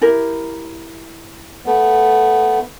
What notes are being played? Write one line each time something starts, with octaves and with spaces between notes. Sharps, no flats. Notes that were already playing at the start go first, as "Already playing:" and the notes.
E4 G4 A#4
A3 B3